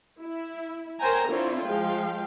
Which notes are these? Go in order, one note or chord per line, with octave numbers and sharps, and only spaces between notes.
E4
A#4 C5 C#5 G5 G#5 A#5
D3 C4 E4 F4 C#5
F3 G#3 F5 G5